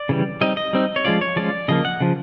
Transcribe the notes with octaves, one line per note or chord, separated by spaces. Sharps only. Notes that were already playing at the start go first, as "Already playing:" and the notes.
Already playing: D5
C#3 E3 G3
G3 C4 D#4 D#5
D#5
G3 C4 D#4
C#5
F3 G#3 C#4 F4 D5
C#5
F3 G#3 C#4 F4 D5
C#3 F3 A#3 D#5
F#5
C#3 F3